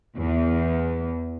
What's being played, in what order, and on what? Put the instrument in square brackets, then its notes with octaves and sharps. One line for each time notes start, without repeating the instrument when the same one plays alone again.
[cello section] E2